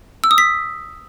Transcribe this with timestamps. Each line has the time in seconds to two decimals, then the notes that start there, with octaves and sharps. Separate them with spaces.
0.24 E6
0.31 D#6
0.38 B6